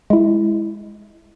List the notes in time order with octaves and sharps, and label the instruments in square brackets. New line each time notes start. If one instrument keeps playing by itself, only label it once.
[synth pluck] G#3 E4